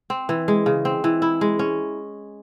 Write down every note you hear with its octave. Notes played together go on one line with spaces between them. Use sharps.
C4
E3
G#3
C#3
C4
E3
E4
G#3
C#4